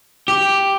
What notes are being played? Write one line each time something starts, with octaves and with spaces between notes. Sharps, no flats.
G4